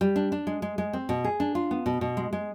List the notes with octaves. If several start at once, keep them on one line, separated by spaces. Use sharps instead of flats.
G3
D4
D4
G#3
G#3
G#3
C4
B2
G#4
D4
F4
B3
B2
B2
G#3
G#3